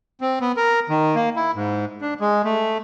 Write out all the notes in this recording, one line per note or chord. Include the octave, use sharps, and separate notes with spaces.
C4
B3
A#4
D#3
A#3
E4
G#2
D4
G#3
A3